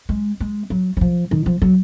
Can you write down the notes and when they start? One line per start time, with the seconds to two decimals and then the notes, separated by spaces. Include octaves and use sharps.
0.09 G#3
0.40 G#3
0.70 F#3
0.97 F#3
1.01 F3
1.31 D#3
1.46 F3
1.62 F#3